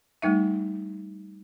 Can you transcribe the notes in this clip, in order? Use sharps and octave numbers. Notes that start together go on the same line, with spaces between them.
G3 A3 D#4 E5